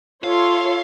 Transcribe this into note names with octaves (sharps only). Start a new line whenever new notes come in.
F4 A4 C#5 E5 F5 C6